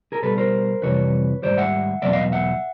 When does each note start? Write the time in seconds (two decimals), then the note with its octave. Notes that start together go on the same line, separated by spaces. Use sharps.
0.12 G#4 A#4
0.22 B2 G3 A4 B4
0.38 A#4 C5
0.82 F2 C3 E3 G3 B4 C#5
1.42 G#2 D#3 G3 C5 D5
1.57 E5 F#5
2.02 E2 B2 F#3 D5 E5
2.13 D#5 F5
2.32 E5 F#5